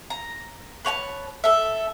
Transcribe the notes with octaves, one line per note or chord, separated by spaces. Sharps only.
A#5
B4 C#5 G5 A5
A4 E5